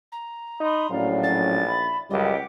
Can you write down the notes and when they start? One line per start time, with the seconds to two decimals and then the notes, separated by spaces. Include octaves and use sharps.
0.12 A#5
0.60 D#4 B5 C6 D#6
0.91 A#1 A2 F#3 C#4 D5 F5
1.23 A6
1.67 E5 B5
2.10 C#2 F#2 G3 G4 D#5 F#5 D6